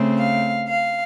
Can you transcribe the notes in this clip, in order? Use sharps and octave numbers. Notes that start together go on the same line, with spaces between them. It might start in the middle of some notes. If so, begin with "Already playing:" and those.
Already playing: C#3 A3 C4
F5
F5